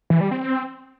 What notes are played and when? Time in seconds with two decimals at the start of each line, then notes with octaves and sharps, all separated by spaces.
0.10 E3
0.21 G3
0.31 C4